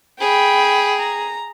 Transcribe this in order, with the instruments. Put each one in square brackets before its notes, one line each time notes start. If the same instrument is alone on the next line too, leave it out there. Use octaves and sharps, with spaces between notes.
[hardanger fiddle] G#4 [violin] G5 B5
[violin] A#5